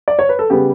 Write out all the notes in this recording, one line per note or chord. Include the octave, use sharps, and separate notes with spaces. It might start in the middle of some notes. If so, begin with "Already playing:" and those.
D5
C#5
B4
A4
C#3 G3 B3 G4